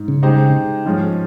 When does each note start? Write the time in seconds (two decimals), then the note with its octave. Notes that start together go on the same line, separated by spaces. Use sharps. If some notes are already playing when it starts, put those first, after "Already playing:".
Already playing: G#2
0.08 C#3
0.23 G#3 D#4 G4 C5
0.86 G#2 F3 G#3 C#4